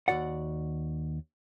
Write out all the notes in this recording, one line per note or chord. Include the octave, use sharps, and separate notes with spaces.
D#2 G#2 F#4 D5 F#5